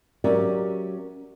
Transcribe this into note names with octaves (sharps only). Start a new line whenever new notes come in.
F#3 C#4 G4 A#4 D5 E5